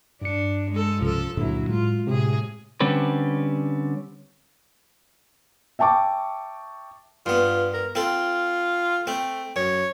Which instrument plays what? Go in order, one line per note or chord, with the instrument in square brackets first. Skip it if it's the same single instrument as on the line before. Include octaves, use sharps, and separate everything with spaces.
[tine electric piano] G2 C#7 [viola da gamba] D4
[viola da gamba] G#3 A4
[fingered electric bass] C2 C#3 [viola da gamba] F3 A4
[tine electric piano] C#2 [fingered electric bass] G2 A#2 D3 [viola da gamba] F#3 E4
[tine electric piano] A2 [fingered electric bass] G#3 [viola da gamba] F4
[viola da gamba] A2 G#4 [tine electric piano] C3
[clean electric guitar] D3 G3 C4 C#4 B4
[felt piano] E5 G5 A5 C#6 D6
[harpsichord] G2 B3 [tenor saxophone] F4
[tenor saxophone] A#4
[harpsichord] C4 A4 [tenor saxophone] F4
[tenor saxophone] A3 [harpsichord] C4
[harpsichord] F#2 [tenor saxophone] C#5